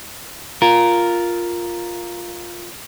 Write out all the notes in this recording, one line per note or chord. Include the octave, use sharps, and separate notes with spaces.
F4 A#4